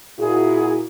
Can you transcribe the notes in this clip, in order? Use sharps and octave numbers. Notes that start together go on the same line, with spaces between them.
A#2 E4 F#4 G#4